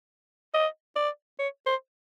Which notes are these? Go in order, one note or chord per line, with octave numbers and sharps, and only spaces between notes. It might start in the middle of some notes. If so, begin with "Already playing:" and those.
D#5
D5
C#5
C5